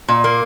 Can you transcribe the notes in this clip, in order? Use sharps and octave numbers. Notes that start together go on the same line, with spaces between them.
A#2
A#3